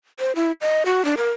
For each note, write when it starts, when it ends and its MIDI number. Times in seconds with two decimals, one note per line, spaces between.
0.19 0.32 72
0.36 0.52 64
0.61 0.83 75
0.86 1.04 66
1.05 1.15 62
1.17 1.33 70